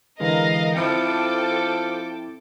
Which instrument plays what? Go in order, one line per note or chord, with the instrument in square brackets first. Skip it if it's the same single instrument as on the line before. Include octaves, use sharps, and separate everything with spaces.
[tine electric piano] D3 E3 G#3 [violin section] A#4 D#5 F5
[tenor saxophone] F3 [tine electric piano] C4 E4 [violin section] A4 G5 D6